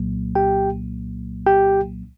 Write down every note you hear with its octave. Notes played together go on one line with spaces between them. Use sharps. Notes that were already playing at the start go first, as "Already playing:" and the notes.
Already playing: C2 A#2 F#3 A#3
G4 G5
G4 G5